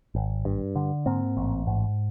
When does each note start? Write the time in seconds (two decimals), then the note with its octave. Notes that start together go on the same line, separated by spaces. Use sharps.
0.15 G#1
0.45 G2
0.76 D3
1.06 G#2 A#3 C4
1.37 A1
1.67 G#2